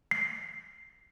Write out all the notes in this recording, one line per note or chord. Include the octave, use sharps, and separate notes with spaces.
C7